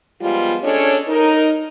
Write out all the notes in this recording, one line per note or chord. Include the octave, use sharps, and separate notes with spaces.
F3 G3 G#3 B3 F4
C#4 D4 G#4 A4 C#5 D#5
D#4 A#4